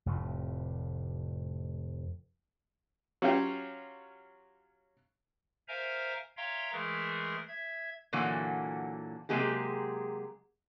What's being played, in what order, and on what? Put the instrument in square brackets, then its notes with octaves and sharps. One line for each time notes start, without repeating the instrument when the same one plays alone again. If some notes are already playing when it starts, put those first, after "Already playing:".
[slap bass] F1 F2 A2
[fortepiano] F#3 C#4 F4 G4
[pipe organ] A#4 C5 E5 F5 G#5 A#5
C#5 E5 F5 G5 A#5 C6
E3 G#3 A3 G#4 A#4
E5 G#6
[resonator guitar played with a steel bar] A#2 D3 E3 F#3 A#3 F#4
C3 F#3 G#3 A#3 G4 G#4